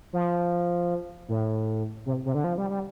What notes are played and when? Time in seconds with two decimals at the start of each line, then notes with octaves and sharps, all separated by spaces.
0.13 F3
1.29 A2
2.06 C3
2.25 C3
2.35 D3
2.44 F3
2.58 G3
2.70 G3